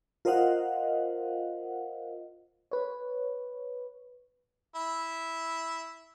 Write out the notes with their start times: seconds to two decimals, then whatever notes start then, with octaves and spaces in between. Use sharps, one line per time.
0.25 F4 A#4 C5 D#5 F5 F#5
2.71 B4 C#5
4.75 E4